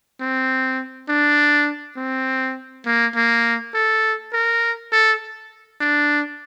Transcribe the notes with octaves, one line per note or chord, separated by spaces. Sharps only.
C4
D4
C4
A#3
A#3
A4
A#4
A4
D4